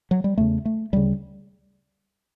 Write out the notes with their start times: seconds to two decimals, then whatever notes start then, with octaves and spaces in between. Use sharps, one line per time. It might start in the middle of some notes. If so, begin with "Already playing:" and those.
0.11 F#3
0.24 G3
0.38 E2 C#3 A3
0.65 A3
0.93 D2 C#3 G3